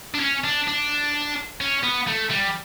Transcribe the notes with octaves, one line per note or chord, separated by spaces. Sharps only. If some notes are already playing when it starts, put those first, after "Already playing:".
D4
C#4
D4
D4
C#4
B3
A3
G3